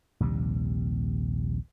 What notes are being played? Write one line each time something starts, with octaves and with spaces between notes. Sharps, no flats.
A#1 D#2 C3 G3